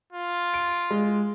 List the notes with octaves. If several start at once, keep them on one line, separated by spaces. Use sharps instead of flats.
F4
D7
G#3